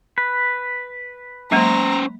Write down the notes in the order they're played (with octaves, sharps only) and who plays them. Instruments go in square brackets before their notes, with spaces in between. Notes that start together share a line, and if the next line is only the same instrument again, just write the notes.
[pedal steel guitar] B4
[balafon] F#3 G#3 A#3 [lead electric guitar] C#4 C5 [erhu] A#5